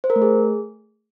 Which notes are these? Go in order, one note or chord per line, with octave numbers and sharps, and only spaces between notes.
C5
A#4
A3
G#4